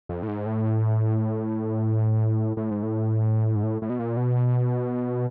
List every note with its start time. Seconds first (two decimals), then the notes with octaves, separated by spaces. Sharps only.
0.09 F2
0.23 A2
0.28 G#2
0.46 A2
2.57 A2
2.71 G#2
2.83 A2
3.56 G#2
3.63 A2
3.82 A2
3.90 B2
3.99 A#2
4.17 B2